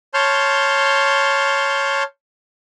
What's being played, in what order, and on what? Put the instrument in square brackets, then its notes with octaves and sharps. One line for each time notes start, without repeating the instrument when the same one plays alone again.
[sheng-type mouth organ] C#5 A5 C6 F6 G6